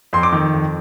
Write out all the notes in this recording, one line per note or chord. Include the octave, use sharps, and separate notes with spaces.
F2 C6
D6
D#3
F2